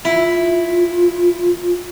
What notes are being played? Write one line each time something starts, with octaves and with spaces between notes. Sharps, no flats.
E4 F4